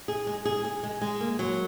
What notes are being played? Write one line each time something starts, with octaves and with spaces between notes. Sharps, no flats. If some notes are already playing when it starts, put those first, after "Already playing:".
G#4
G#3
G#4
G#4
G#3
G#3
A#3
F#3